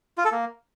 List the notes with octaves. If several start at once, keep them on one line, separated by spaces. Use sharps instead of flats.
F4
A4
A#3